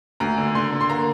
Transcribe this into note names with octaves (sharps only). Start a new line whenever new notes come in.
D2 A#5
D3
D3 C6
D3
C6
A#3 A#5